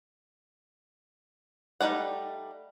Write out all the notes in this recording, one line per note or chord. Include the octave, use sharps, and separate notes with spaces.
G3 A3 D#4 D5 F#5